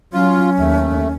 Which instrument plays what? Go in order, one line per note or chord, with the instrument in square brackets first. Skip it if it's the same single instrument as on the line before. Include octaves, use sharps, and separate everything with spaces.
[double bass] F#3 [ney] C#4 [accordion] F4
[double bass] D#2 [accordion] A3